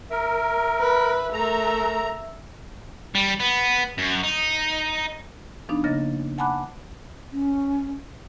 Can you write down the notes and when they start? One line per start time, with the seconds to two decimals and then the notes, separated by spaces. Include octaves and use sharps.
0.11 A#4 E5
0.80 B4
1.33 A3 A#4 A#5
3.15 G3
3.40 B3
3.98 F#2
4.24 D#4
5.69 F3 B3 D4 D#4
5.84 C#3 A#3 D#5 A6 A#6
6.38 F#5 G#5 A5 B5 D6 F#6
7.32 C#4